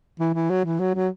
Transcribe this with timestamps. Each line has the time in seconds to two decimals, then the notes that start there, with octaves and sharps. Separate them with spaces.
0.19 E3
0.34 E3
0.50 F#3
0.65 E3
0.80 F#3
0.95 F#3